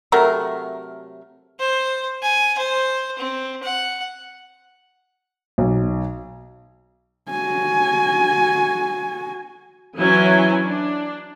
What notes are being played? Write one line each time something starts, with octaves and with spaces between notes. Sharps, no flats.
C3 F#3 A3 A#4
C5
G#5
C5
C4
F#5
B1
F#4 G#5
E3 F#3 C#4 E4 B4 G#5
D4